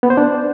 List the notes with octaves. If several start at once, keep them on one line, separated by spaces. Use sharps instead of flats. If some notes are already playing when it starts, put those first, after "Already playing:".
B3
C5
D4